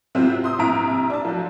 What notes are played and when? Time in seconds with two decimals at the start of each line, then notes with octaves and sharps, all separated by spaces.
0.15 C3 F#3 C4 E4 F4
0.44 C6 D#6 E6
0.58 A#1 C3 E4 A#5 D7
1.10 D4 A5
1.25 F3 F#3